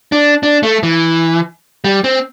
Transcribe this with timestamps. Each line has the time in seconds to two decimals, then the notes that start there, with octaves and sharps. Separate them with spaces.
0.12 D4
0.43 D4
0.63 A3
0.83 E3
1.84 G3
2.04 C4